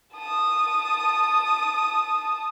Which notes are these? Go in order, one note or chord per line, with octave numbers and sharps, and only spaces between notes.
A5 D#6